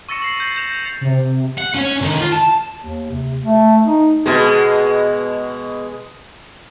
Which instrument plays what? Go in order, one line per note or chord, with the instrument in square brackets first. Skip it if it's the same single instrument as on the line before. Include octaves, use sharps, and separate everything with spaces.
[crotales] C#6 E6 A6 A#6 C#7 E7
A#6 C7 F#7
G6 A6 C7
G6 A#6 E7 F7
C7
[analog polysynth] C3
[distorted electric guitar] F#5
C#4 C#5
D3 D#3
F4
A5
[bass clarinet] D#2
C3
A3
D#4
[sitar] B2 G#3